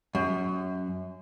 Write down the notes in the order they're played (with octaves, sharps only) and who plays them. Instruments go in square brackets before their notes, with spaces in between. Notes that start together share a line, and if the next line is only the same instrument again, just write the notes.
[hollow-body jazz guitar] F#2